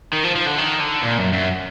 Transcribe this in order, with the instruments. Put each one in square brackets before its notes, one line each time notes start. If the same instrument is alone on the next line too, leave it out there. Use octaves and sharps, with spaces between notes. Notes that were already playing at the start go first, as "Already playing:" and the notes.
[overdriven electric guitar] D#3
F3
F3
D3
D#3
D3
A#2
F#2
F#2